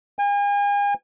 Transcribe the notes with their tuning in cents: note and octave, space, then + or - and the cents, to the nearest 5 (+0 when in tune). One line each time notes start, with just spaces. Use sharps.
G#5 -40